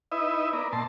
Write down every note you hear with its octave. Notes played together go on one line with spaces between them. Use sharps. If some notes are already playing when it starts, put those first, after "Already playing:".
D#4 E4 B4 D#5 E5
B3 A#4 D5
A#2 A5 C6